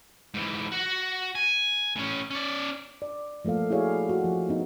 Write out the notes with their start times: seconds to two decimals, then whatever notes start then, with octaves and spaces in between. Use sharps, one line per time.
0.34 G#2 E3
0.72 F#4 F#5
1.35 G#5
1.96 A2 C#4
2.31 C#4 D5
3.02 D5
3.45 F3 A3 A#3 A4 F5
3.70 E4 F#4 G#4 C#5 D5 F5
4.09 F#4
4.24 F3
4.49 B3 D#4